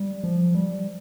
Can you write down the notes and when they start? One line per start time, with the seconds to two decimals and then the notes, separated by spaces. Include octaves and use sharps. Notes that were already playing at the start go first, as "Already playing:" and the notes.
Already playing: G3
0.24 F3
0.55 G3